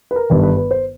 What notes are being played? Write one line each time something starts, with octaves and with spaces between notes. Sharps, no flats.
B4
A#4
G1 G2 D#3 B4
B4
B4
C5